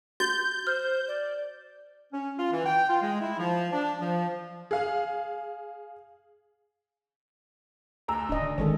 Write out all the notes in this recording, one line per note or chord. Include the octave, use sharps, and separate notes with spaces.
F#4 G6 A6
C5 F6
D5
C#4
F4
E3
G5
F4
G#3
E4
F3
D4
F3
G#4 F5
D2 A#5 E6
D1 D4 D#5
D3
G1 D#3 G#3 C#4 A4